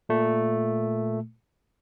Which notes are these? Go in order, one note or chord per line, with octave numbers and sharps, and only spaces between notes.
A#2 A3